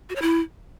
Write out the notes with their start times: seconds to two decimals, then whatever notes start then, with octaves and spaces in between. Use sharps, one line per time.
0.10 F#4
0.16 C#5
0.22 E4